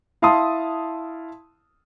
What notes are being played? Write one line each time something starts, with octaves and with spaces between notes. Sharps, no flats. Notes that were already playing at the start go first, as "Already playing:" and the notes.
E4 F5 A5 C6 D#6